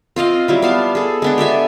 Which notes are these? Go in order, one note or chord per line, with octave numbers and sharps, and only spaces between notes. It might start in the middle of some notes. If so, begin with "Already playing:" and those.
C4 F4 D#5 F5
F#3 G3 E4
B3 F5 A5
G#4 A4
G#3 B3 D4
G4 A4 E5 G#5